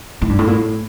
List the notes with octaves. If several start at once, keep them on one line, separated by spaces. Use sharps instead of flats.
A2
G2
A2
A#2
A2